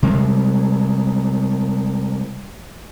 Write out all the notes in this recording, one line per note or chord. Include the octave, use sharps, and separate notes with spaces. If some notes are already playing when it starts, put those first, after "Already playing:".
C3 G3 G#3